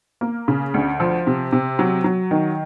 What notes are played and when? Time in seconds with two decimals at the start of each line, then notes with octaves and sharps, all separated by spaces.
0.21 A#3
0.48 C#3
0.74 D2
1.00 F3
1.27 C3
1.52 C3
1.79 F#3
2.04 F#3
2.31 D#3